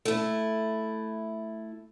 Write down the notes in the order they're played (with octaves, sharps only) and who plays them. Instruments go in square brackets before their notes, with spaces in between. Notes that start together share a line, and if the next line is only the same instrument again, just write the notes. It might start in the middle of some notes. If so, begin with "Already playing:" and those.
[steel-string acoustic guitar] A3 E4